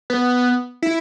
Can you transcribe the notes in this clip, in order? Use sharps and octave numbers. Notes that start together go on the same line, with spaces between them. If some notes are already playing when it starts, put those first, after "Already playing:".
B3
E4